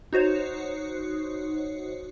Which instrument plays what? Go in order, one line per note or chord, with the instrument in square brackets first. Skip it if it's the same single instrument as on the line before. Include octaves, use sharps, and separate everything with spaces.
[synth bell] D#4 F#4 C5 C#5